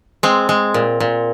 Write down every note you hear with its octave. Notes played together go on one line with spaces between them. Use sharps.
G#3 C4
G#3
A#2
A#2